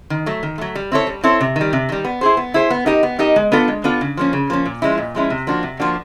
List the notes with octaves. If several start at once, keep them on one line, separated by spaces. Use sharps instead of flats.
D#3
F#3 A3
D#3
F#3 A3
G3
C4 E4 A4 C#5
G3
C4 E4 A4 C#5
C3
D#3 G3
C3
D#3 G3
B3
E4 G#4 C5
B3
E4 G#4 C5
B3
D#4 G4 A#4 D#5
B3
D#4 G4 A#4 D#5
G#3
B3 D4 F4 A4
G#3
B3 D4 F4 A4
C#3
F3 A#3 C#4
C#3
F3 A#3 C#4
A#2
F3 G#3 C#4 E4
A#2
F3 G#3 C#4 E4
C3
F3 A#3 D4 F#4
C3
F3 A#3 D4 F#4